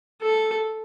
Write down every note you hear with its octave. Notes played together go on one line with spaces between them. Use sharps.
A4